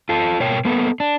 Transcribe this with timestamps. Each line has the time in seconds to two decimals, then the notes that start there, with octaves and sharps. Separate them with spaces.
0.09 F4 A4
0.40 B2 A#4 C#5 G5
0.65 A#3 B3 A4 B4
1.00 D4